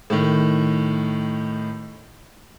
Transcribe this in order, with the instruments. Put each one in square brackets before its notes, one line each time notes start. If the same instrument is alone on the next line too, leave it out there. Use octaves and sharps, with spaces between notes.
[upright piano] A2 D#3